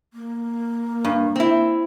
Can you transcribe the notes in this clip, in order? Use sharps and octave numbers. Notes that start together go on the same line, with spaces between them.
A#3
G2
C4 E4